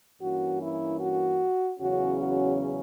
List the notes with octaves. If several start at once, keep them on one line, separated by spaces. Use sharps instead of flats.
G2 E3 A#3 C#4 F#4
E4
F#4
E2 C#3 F#3 C#4 F#4
F#4